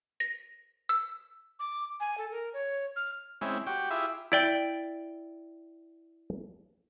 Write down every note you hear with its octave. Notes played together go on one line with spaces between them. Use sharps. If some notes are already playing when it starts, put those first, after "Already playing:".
A#6
E6
D6
G#5
A4
A#4
C#5
F6
G#3 C4 C#4 E4
F#4 G4 G5
E4 F4 G4 G#4 E5
E4 D5 G5